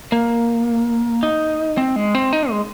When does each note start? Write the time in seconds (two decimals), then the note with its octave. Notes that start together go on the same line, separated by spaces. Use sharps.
0.12 A#3
1.23 D#4
1.78 C4
1.96 G#3
2.15 C4
2.33 D#4
2.50 G#3